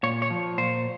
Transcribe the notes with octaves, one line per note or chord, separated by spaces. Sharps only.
A#2 C#5
C#5
F3
A#2 C5